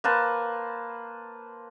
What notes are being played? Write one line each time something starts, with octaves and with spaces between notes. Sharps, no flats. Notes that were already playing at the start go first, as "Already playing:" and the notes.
A#3 B4 C5 A5